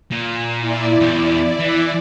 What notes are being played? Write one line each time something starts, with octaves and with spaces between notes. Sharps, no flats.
A#2
E4 D5
E2 G4
E3